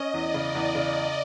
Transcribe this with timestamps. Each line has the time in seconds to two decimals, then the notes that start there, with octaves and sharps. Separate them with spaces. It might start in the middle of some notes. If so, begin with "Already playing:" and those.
Already playing: C#4 D#5
0.14 E2 D5
0.34 C#3
0.55 E2
0.75 C#3